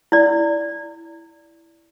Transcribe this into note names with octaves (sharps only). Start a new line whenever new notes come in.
E4 D5